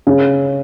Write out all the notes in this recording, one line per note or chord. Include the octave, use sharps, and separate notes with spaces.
C#3